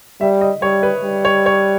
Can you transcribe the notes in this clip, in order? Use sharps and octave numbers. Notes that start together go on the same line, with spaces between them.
G3 E5
D#5
G3 C#5
B4
G3
C#5
C#5